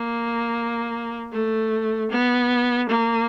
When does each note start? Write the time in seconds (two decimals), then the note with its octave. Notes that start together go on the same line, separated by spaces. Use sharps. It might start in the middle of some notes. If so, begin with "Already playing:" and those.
Already playing: A#3
1.33 A3
2.11 B3
2.89 A#3